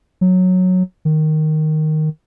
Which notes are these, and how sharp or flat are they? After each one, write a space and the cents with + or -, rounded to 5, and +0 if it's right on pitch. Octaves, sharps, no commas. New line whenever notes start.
F#3 -10
D#3 -5